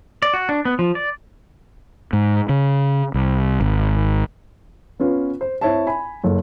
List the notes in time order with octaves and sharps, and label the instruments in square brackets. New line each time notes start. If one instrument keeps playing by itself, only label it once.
[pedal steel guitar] D5
F#4
D4
B3
F3
D5
[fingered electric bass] G#2
C#3
C2
G#1
[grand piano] B3 C#4 F4 B4
C5
C4 E4 C#5 E5 A5
G#5 B5
F#1 A4 C#5